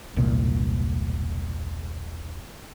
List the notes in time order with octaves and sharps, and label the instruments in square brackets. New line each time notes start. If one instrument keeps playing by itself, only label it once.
[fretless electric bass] E1 C2 A#2